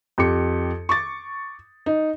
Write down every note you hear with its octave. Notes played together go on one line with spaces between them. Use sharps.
F2 G4 C#7
C#6 D6 A6
D#4